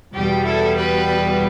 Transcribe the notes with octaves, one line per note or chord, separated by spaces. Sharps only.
E2 B2 G3 G4
E4 A4
G4 B4